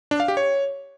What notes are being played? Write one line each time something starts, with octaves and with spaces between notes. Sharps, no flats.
D4
F5
G4
C#5